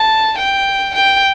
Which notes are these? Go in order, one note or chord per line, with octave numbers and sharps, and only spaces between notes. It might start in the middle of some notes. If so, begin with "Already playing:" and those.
Already playing: A5
G5
G5